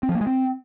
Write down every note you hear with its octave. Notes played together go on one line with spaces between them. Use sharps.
C4
F3
A#3
G#3
C4